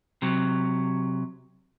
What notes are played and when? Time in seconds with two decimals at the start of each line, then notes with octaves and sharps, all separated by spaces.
0.22 C3 F#3